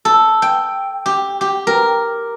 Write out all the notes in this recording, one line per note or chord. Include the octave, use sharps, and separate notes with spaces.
A4
G5
G4
G4
A#4